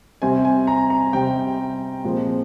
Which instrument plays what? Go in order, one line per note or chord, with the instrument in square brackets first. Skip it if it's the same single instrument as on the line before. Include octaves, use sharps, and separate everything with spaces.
[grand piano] C3 G3 C4 G#5
G#5
A#5
A#5
C3 G3 C4 G5
A#2 F3 G#3 C4